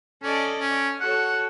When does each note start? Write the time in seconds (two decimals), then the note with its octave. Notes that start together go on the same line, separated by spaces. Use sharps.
0.23 C#4 A4 D5 D#5
0.60 C#4
1.01 F#4 A4 C#5 F#5